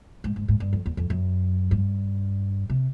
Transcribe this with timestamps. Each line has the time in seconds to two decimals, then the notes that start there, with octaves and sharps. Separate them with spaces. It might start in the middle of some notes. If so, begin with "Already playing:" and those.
0.24 G#2
0.36 G#2
0.48 G#2
0.60 G2
0.73 F2
0.86 E2
0.97 F2
1.10 F#2
1.71 G2
2.70 C3